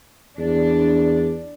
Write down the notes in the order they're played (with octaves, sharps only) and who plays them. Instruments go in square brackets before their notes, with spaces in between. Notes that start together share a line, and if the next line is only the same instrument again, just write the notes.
[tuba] E2 [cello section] D4